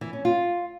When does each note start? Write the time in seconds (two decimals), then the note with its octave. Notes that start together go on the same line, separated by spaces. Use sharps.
0.01 E3
0.13 C#4
0.25 F4